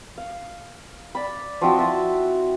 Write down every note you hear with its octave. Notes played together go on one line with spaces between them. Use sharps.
F5
D5 B5
F3 C4 E4 F#4
E5 F#5 A5